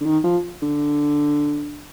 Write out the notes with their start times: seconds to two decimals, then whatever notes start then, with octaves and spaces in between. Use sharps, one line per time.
0.01 D3
0.05 D#3
0.24 F3
0.62 D3